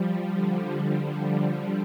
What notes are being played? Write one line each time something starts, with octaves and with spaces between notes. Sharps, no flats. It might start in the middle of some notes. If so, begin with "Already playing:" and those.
Already playing: F3 G3
D3
F3